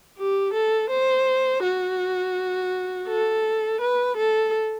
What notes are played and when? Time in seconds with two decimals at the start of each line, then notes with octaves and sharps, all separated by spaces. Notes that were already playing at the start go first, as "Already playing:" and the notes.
0.18 G4
0.54 A4
0.90 C5
1.63 F#4
3.08 A4
3.81 B4
4.17 A4